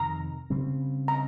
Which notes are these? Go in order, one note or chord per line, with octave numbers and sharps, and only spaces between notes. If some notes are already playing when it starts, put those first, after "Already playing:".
Already playing: F2 C3 D#3 A#5
C#3 G3 C4
A#5